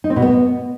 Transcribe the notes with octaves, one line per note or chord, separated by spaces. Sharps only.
D#4
C4
B2
B3